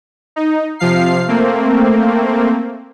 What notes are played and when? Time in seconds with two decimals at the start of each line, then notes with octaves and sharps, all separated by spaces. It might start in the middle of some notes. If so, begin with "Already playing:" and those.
0.36 D#4
0.79 C3 F3 F5 C7
1.28 A3 A#3 C4